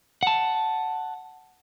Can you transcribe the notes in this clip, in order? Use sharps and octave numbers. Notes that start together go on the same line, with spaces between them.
F#5 A5